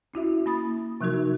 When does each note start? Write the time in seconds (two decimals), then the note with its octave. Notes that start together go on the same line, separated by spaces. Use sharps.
0.14 C#4 E4 F#4 E5
0.46 A#3 B5 D#6 A6
1.01 C3 F3 F#3 D#4 F#4 A#4